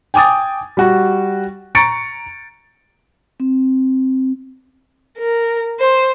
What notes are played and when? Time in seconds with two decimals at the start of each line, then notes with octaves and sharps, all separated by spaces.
0.14 G5 G#5 D6 D#6 A6
0.77 G3 F#4
1.75 A#5 C#6 A6 C#7 D7
3.40 C4
5.18 A#4
5.78 C5